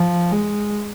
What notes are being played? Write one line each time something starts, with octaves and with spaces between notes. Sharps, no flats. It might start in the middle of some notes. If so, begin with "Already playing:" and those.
Already playing: F3
G#3